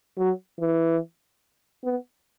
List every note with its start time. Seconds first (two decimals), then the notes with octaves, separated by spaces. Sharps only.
0.18 F#3
0.60 E3
1.84 B3